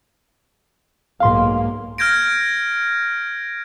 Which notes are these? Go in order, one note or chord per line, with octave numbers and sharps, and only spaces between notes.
B1 G#2 A#3 F5 C6
F6 G6 G#6 A#6 D7